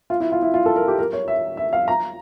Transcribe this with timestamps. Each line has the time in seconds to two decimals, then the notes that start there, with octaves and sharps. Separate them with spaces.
0.10 F4
0.20 E4
0.32 F4
0.43 E4
0.54 F4
0.66 A4
0.76 A#4
0.88 G4
0.99 A#4
1.13 C#5
1.28 E5
1.57 E5
1.73 F5
1.88 A#5